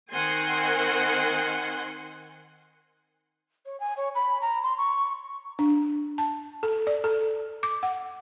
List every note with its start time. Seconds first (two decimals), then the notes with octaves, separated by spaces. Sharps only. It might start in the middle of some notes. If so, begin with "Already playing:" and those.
0.12 D#3 C4 A#4 F#5 G#5 C6
3.66 C#5
3.80 G#5
3.97 C#5
4.15 B5
4.41 A#5
4.63 C6
4.78 C#6
5.59 D4
6.18 A5
6.63 A4
6.87 D5
7.04 A4
7.63 D6
7.83 F#5